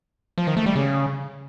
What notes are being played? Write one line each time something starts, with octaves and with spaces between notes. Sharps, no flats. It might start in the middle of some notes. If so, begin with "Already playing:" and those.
F3
D#3
A3
G3
C#3